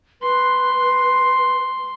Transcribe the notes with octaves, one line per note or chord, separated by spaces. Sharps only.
B4 C6